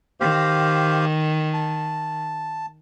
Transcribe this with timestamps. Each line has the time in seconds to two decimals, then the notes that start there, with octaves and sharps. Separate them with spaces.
0.20 D#3 G4 C5 F5
1.53 A5